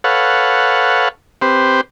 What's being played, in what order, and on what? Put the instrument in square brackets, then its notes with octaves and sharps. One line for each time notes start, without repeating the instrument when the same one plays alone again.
[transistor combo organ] A4 B4 C#5 F5 F#5
C4 G4 B4 C5